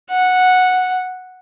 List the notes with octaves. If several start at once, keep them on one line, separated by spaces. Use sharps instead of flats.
F#5